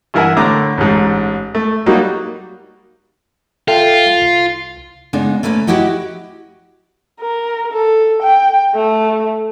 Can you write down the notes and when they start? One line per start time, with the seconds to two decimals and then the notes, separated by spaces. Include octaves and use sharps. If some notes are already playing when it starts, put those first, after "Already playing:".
0.14 G2 E3 A#4 E5 F#5 G#5
0.37 A2 D3 A#5 D6
0.78 A1 G#2
1.55 A3
1.86 F#3 G3 A#3 D#4 F#4
3.68 F4 A4 E5 G5
4.22 C2
5.13 C#3 G#3 B3 D4 D#4
5.43 A3 A#3 C#4 B4
5.67 E4 F#4 G4 D#5 F#5
7.21 A#4
7.73 A4
8.23 G5
8.75 A3